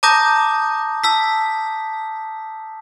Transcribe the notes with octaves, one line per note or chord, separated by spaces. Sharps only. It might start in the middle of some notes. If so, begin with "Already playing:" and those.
A5 A#5 D6 D#6 G6 A#6
A5 E6 B6